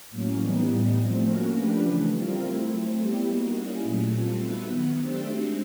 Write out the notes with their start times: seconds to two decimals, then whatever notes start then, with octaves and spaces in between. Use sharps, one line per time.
0.10 A2 F#3 A#3 C#4
0.39 E3 G3 B3 D#4
0.67 A2 E3 G3 B3 D#4
0.96 F3 A3 C4
1.25 A#3 C#4 F#4 A#4
1.53 F3 A3 D4 G4 B4
1.82 C#3 E3 A3
2.11 G3 C4 F4 A#4
2.39 A3 C4 E4
2.68 F#3 A3 C4
2.97 G3 B3 E4 G4
3.25 A#3 D#4 F#4
3.54 G3 A#3 C#4 E4 G#4
3.82 A#2 F#3 A3
4.11 G3 C4 F4 A4
4.40 B3 D#4 F#4 B4 E5
4.69 D#3 F#3 B3
4.97 A3 D4 G4 C5 E5
5.26 G#3 C4 D#4 F#4